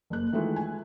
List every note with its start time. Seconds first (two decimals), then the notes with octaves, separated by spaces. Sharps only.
0.10 F#1 A#3 F#6
0.32 D#3 E3 G#3 A3 E4 F4
0.56 G#5